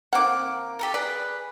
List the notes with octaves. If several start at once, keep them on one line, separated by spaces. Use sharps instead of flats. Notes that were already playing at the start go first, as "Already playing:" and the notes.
D#3 A#3 C4 F#5 D6
G4 A4 A#4
G#4 B4 D5